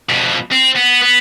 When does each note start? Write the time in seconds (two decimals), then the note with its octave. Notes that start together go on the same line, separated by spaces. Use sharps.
0.09 F2 B2
0.51 C4
0.76 B3
1.02 B3